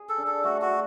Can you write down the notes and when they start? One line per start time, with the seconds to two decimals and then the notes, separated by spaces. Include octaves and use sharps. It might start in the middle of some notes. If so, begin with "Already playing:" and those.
Already playing: G#4
0.09 A4
0.18 D4
0.27 A4
0.44 A3 F#4
0.62 F#4
0.70 A3